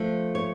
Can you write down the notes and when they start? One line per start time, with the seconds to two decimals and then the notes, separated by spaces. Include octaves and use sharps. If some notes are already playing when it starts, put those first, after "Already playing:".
Already playing: F3 A3 D4
0.35 C#5